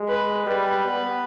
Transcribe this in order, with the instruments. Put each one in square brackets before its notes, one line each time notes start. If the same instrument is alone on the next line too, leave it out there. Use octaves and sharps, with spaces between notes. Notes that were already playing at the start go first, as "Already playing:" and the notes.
Already playing: [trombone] G#3
[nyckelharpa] B4
[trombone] G3 [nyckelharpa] B4
[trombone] B3